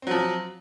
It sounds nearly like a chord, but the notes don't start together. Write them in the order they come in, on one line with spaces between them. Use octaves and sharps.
C4 F#3 F3